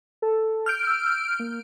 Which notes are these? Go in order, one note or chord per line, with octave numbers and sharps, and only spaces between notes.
A4
F6 G6 D7
E6
A#3